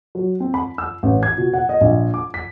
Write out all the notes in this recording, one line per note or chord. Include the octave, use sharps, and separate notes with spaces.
F#3
C4
B5
E6
A1
G#6
B2
F#5
D#5
A#1
D6
B6